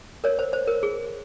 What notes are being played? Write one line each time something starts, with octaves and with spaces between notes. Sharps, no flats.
A#4 C#5
C5
C5
A#4
G#4